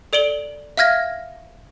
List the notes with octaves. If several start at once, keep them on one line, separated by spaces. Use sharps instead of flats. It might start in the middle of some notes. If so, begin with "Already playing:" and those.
A4 D5 D7 F#7 G7
E5 F5 F6 G#6 A#6